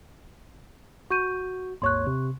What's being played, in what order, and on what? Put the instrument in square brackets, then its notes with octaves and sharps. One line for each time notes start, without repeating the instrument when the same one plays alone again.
[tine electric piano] F#4 [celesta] C#6 G6 D#7
[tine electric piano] G#1 D#2 C#5 [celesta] C6 C#6 F#6
[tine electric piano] C3